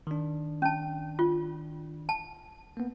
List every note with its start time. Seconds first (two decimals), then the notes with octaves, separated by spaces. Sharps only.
0.07 D#3 D4
0.62 C#4 A5
1.19 F4
2.09 A5
2.77 A#3 B3